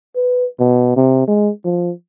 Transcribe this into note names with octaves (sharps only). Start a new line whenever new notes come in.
B4
B2
C3
G#3
F3